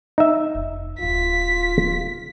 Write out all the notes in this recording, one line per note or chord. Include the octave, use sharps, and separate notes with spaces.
D#4 E5
F1
D1 B3 F4 B6